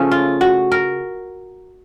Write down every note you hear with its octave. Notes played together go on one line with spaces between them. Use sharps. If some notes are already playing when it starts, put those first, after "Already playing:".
Already playing: C#3 F3 A3 C#4
F4
F#4
A#4